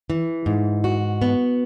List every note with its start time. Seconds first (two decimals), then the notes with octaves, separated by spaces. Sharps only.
0.10 E3
0.46 G#2
0.84 F#4
1.22 B3